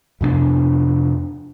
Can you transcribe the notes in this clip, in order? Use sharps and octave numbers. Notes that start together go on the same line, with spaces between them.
F2 C3 A#3 D4